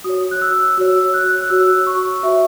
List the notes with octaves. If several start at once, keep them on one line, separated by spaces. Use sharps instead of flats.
F#4 C#5 D#6
F#6
E6
F#4 C#5 E6
F#6
F#6
F#4 C#5 E6
C#6
F#4 C#5 E5